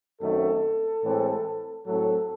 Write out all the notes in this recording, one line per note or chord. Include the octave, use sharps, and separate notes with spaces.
F#2 D#3 A3 C4 A4
A2 E3 G#3 C4
A2 F#3 A3 C4 A4